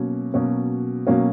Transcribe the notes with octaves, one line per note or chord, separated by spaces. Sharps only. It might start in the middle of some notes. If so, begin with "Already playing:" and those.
Already playing: B2 F#3 A#3 C#4
B2 F#3 A#3 C#4
B2 F#3 A#3 C#4